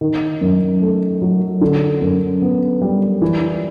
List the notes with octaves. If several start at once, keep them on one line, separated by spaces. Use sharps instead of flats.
D#3
F#2
A3
F#3
D3
F#2
B3
G3
E3